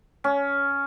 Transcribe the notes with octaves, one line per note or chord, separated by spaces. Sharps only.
C#4